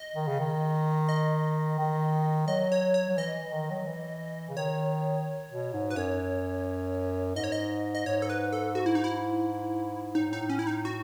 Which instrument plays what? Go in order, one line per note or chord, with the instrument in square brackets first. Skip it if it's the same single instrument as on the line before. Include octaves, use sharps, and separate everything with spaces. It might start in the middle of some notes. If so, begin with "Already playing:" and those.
Already playing: [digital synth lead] D#5
[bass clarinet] D#3
C#3
D#3
[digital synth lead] D#5
[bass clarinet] D#3
[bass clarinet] F#3 [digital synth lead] D#5
[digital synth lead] C#5
C#5
[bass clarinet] F#3
[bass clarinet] E3 [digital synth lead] D#5
[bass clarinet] E3
D#3
F#3
E3
C#3
[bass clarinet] D#3 [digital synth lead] C#5
[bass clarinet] B2
G#2
[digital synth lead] B4
[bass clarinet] F#2 [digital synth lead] C#5
[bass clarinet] G#2 [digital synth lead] D#5
[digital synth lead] C#5
D#5
D#5
[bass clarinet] G#2 [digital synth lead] C#5
[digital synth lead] A4
B4
A4
F#4
E4
D#4
E4
[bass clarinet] A2 [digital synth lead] D#4
[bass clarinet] G#2
[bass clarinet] A2 [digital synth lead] D#4
[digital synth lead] C#4
E4
D#4
F#4